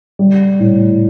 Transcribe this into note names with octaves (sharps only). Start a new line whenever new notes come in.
G3
A2